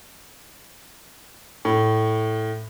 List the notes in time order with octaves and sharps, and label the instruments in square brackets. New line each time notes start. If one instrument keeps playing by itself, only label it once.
[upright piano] A2